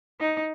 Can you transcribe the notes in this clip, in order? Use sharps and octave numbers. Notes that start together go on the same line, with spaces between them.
D#4